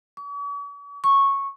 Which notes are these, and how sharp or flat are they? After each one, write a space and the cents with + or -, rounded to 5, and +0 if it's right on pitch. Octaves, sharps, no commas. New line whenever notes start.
C#6 +45
C#6 -10